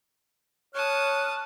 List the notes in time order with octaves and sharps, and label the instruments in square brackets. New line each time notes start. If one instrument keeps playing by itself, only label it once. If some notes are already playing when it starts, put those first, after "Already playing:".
[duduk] C#5 [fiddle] A5 D#6 [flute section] F6 F#6